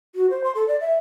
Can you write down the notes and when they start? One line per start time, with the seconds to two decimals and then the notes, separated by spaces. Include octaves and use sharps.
0.15 F#4
0.30 C5
0.44 C6
0.55 A4
0.68 D5
0.81 E5